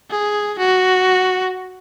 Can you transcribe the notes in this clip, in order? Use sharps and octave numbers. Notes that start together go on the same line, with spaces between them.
G#4
F#4